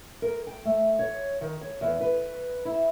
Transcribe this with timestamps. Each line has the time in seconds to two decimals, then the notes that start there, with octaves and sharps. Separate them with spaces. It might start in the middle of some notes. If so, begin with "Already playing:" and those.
0.22 A#4
0.47 G5
0.65 A3
0.99 C#5
1.41 D#3
1.61 C#5
1.81 E2
2.01 B4
2.65 E4